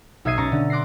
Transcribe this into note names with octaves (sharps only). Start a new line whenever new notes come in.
B1 E5 D#6 G#6 C7 D#7
B2 C#4 A#5 C#6 A6
D3
C6 D6 F#6 A#6 C7